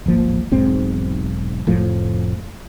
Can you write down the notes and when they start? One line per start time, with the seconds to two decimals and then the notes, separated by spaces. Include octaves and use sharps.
0.06 D1 G#1 F3 A#3
0.51 E1 B1 G#2 C4
1.67 F1 A2 F3